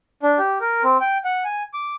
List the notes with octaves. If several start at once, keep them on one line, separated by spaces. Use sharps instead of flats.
D4
G4
A#4
C4
G5
F#5
G#5
D6